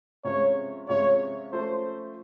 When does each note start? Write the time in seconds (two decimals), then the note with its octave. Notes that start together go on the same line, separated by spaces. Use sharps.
0.24 C3 F3 G#3 C#4 F4 C#5
0.88 C3 F3 G#3 C#4 F4 C#5
1.52 F3 A3 C#4 C5